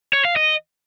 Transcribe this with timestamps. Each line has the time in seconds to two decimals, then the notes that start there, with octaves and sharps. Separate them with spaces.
0.13 C#5
0.25 F5
0.36 D#5